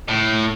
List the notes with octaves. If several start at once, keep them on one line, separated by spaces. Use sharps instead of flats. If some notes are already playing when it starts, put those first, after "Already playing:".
A2